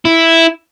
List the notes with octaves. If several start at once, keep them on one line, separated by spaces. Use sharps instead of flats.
E4